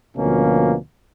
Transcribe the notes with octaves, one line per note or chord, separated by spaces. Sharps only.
D2 B2 F3 A#3 C#4